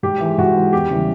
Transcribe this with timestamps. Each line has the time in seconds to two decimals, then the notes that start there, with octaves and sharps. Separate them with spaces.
0.03 G#2 G4
0.21 E3
0.26 G#3
0.38 G#2 F#4
0.55 E3 G#3
0.73 E2 G4
0.90 C#3 E3 G3